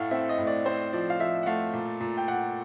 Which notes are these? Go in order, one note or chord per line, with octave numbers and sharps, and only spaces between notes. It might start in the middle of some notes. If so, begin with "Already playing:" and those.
Already playing: A2 A3 F5 F#5
C4 E5
D#5
A2
D5
C4 C5
F3 D5
F5
F3 E5
F#5
A3 F5
A#2
A#2
G5
A#2 F#5